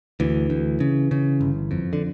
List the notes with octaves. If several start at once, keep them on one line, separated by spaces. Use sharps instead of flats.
D2 E3
D2
C#3
C#3
G1
F2
D3